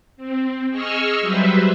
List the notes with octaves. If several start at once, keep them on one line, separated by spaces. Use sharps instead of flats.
C4
G#4 D#5 C#6 E6 F6
F#3 G3 B4 C5 E5